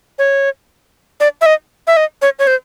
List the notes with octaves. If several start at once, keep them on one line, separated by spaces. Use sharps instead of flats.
C#5
D5
E5
D#5
E5
D#5
C#5
C#5
C5